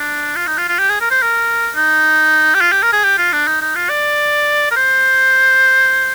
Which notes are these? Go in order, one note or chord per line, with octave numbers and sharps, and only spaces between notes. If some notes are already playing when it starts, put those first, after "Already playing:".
Already playing: D4
F4
D#4
F4
F4
G4
G#4
A#4
C5
A#4
D#4
G4
F4
G4
A#4
G#4
G4
F4
D4
D#4
D#4
F4
D5
A#4
C5